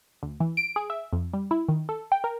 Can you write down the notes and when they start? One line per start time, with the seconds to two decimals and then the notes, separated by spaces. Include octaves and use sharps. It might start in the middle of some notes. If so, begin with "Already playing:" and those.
0.23 D2
0.40 E3
0.57 D7
0.76 G#4
0.90 E5
1.12 F2
1.33 G3
1.51 E4
1.68 D#3
1.89 A4
2.12 G5
2.24 A#4